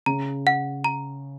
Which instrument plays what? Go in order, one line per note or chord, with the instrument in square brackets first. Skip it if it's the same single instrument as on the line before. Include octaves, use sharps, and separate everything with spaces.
[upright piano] C#3 [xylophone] A#5
[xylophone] F#5
A#5